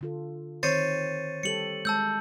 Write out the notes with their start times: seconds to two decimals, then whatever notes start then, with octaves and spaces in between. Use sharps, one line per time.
0.01 D3 F4 A4
0.63 D#3 C4 C5 C#5 A6 C#7 D#7
1.43 G3 G4 A4 C#7 F#7
1.85 G#3 A5 E6 G6